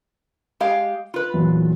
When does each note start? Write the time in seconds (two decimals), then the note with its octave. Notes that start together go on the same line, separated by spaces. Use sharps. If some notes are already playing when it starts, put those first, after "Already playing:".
0.60 G#3 G4 F5
1.14 F4 B4
1.34 E2 A#2 F#3